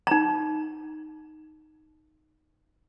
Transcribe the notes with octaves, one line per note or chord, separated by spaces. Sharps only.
D#4 A#5